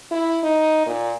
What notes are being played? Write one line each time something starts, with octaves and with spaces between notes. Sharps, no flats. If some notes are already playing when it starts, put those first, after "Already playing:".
E4
D#4
A#2